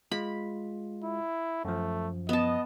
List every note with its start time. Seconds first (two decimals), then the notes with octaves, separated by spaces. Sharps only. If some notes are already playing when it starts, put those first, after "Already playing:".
0.11 G#3 F4 B5
1.04 E4
1.65 F#2 F3 A3
2.29 B3 D#5 A5